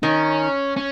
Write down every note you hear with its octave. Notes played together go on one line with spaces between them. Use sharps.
D#3 C#4
C#4